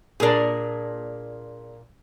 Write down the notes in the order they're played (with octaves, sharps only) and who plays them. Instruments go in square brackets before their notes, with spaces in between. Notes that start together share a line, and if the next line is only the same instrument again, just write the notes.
[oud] A#2 D4 [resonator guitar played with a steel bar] G#4 A#4